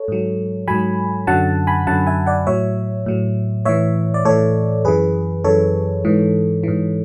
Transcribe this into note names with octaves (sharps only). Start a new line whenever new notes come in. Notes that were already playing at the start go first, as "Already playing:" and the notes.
Already playing: A4 C#5
G#2 F#3
G#2 F#3 G#5 B5
F#2 D3 F#3 F#5 A5
G#5 B5
F#2 D3 F#3 F#5 A5
E5 G#5
D5 F#5
A2 F#3 C#5 E5
A2 F#3
A2 E3 C#5 E5
D5
A2 E3 A4 C#5
F#2 E3 G#4 B4
F#2 E3 A4 C#5
G#2 E3
G#2 E3